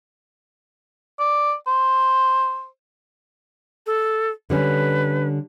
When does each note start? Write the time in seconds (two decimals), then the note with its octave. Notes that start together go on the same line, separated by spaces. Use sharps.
1.20 D5
1.67 C5
3.86 A4
4.50 D3 G3 C#4 B4